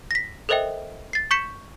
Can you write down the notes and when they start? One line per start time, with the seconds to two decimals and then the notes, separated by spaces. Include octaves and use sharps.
0.11 A#6 B6
0.49 A4 A#4 C5 D#5 E5 G5
1.13 A6 C7
1.31 C#6 G6 B6 C#7 E7